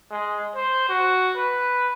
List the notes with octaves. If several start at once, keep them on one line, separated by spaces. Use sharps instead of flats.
G#3
C5
F#4
B4